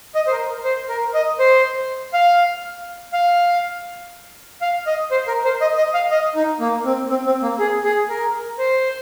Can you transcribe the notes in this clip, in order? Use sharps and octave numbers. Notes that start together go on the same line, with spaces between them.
D#5
C5
A#4
C5
A#4
D#5
C5
F5
F5
F5
D#5
C5
A#4
C5
D#5
D#5
F5
D#5
D#4
A#3
C4
C4
C4
A#3
G#4
G#4
A#4
C5